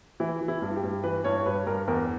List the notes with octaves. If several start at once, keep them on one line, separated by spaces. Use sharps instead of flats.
E3 E4
E3
E4
G2
G4
G2
E3 B4
G2 C#5
C#5
G2 B4
G2 A#4
E2 A#4